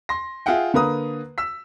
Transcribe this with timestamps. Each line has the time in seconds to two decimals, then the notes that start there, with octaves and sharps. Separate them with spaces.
0.09 C6 A#6
0.46 F4 G#4 E5 F#5 G5
0.74 D3 A#3 B4 A#5 D#6
1.38 E6 B6